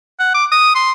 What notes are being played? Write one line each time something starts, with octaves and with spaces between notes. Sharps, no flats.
F#5
D6
D#6
C6